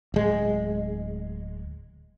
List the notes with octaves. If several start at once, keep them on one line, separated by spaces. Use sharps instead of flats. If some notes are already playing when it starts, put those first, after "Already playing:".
D1 G#3